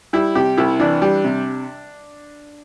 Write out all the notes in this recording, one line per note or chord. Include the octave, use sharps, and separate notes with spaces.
G3 E4
C3 G4
C2 E4
E3 D4
G3
C3